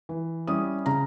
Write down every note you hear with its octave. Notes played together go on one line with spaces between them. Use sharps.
E3
G3 C#4 E4 D#6
C#3 A#5